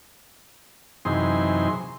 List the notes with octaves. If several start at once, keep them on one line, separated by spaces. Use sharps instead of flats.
F#2 C3 E3 D#4 G#4 C6